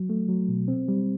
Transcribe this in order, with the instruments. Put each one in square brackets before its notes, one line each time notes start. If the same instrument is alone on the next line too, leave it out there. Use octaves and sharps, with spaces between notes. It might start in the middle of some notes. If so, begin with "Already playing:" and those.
Already playing: [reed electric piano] F#3
A3
F#3
B2
C4
G3